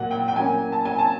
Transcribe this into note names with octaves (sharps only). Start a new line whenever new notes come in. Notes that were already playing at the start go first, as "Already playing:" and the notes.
Already playing: A#2 F#3 A#3 F#5
G5
G5
F#3 A#3 C#4 G#5
A5
G#5
A5